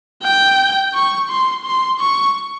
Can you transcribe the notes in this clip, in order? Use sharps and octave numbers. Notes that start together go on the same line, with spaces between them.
G5
C#6
C6
C6
C#6